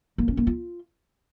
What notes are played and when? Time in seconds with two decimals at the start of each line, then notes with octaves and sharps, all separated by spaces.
0.18 A#3
0.28 C#4
0.37 A#3
0.47 F4